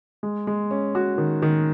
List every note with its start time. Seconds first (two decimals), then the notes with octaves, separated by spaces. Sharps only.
0.23 G#3
0.47 G#3
0.71 C#4
0.95 F#4
1.18 D#3
1.42 D#3